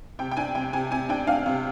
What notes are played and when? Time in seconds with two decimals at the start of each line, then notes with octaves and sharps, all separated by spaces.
0.19 C3 G5
0.31 G5
0.37 D4 G#5
0.55 C3 G5
0.73 C3 G#5
0.91 C3 G#5
1.09 D4 G5
1.27 D4 F5
1.46 C3